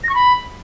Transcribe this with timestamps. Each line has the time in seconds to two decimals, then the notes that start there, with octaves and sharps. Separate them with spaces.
0.04 A#6
0.09 C#6
0.15 B5